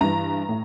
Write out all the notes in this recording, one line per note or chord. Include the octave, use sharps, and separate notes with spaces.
G2 E3 A#5
A2